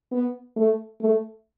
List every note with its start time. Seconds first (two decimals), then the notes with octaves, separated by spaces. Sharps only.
0.12 B3
0.56 A3
1.01 A3